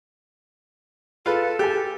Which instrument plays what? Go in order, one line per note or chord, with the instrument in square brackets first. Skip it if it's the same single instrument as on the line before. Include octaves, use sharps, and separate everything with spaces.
[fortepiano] F4 B4 [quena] A4
[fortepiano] G4 G#5